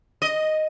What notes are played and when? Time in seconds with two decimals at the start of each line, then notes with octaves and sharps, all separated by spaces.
0.22 D#5